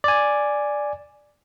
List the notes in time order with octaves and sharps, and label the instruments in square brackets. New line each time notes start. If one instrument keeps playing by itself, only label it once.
[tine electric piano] D5 G#5